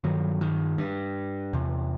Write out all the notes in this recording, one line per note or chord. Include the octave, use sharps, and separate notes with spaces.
G2 D#3 F#3
D#3
G2
E2 C3